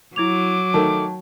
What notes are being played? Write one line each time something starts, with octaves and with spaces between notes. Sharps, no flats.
F#3 E4 D6 G#6 F7
D#3 A3 A5